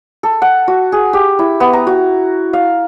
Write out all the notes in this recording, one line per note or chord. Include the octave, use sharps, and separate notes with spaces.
A4
F#5
F#4
G#4
G4
E4
B3
A#5
F#4
F5